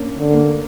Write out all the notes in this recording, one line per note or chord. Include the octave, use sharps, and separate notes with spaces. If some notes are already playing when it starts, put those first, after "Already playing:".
Already playing: A#3 C#4 D4
D3
A#3